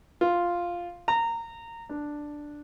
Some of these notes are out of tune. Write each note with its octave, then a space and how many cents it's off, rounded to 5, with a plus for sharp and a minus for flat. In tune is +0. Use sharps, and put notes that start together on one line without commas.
F4 +0
A#5 -20
D4 +5